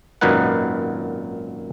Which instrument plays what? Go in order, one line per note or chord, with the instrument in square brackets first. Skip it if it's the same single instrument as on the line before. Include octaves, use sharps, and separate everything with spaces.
[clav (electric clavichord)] G#1 F#2 A#2 D#4 B4 F#5